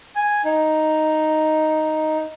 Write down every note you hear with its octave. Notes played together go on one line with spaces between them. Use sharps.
G#5
D#4